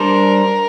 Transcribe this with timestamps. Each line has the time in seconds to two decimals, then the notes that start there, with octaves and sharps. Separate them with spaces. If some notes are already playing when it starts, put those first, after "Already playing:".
Already playing: G3 D4 A4 A#4 C5